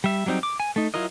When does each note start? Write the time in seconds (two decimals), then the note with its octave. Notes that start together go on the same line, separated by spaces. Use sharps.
0.04 G3 E5
0.26 F#3 G3 C4 D#4
0.43 D6
0.60 G#5
0.76 A3 D#4
0.94 F#3 E4 F4 A#4 D#5